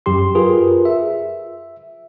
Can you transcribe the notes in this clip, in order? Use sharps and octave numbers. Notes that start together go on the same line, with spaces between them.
F#2 F#3 G4 C6
F4 G#4 A#4 B4
E5